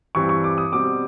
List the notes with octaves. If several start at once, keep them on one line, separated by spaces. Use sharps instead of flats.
G2 E3 G3 C4 C#6
C#6
D6
D#6
B2 G3 C4 D6